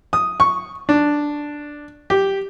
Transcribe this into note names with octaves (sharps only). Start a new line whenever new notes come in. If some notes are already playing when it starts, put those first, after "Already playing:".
D#6
C#6
D4
G4